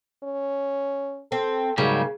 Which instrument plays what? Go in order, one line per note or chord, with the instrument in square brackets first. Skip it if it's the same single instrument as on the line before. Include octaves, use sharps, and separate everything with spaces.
[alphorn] C#4
[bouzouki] C4 [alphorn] A4
[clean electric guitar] G#2 F#3 G3 [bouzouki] C#3 [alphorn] A#3